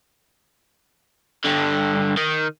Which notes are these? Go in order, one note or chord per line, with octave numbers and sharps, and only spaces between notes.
G2 D3
D#3